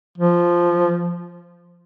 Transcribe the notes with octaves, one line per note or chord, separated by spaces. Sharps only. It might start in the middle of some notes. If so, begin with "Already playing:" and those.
F3